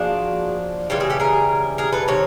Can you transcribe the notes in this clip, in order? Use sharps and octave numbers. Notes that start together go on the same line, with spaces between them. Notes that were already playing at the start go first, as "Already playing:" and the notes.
Already playing: F3 A#3 D4 F#4 G#4
C#3 E3 G3 F4 G4
F#4 G#4
G4 A4
G#4 A#4
G#4 A#4
A4 B4
C3 D#3 C#5